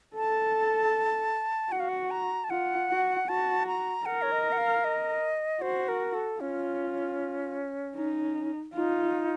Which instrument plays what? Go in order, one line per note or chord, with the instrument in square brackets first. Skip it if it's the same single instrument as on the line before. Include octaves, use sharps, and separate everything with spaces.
[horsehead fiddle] A4 [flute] A5
[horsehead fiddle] F#4 [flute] F#5
[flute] F5
F#5
A#5
A5
[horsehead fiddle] F4 [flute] F#5
[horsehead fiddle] F#4
[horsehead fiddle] F#4 [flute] A5
[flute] A#5
[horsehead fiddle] A#4 [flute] F#5
[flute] C#5
D#5
F#5
F5
D#5
[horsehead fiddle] F#4 [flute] C5
[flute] A#4
A4
[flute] C#4 [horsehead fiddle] F4
[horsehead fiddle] D#4
[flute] D#4 [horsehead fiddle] F4